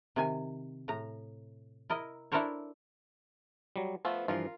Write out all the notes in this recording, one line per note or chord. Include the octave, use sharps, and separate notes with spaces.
C3 D#3 G#5
A2 A#5
E4 A#4 D#5
D4 E4 A4 A#4 C5 C#5
F#3 G3
F3 A3 B3 F4
G2 E3 F3 F4 A#4